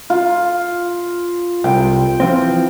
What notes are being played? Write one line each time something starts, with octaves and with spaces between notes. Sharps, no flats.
F4
C2 G5
E3 F3 C4